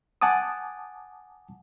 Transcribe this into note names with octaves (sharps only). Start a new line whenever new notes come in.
F#5 G#5 A5 D6 D#6